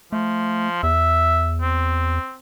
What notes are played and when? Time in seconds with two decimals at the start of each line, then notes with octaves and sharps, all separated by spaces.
0.12 F3 A3
0.83 E2 E5
1.62 C4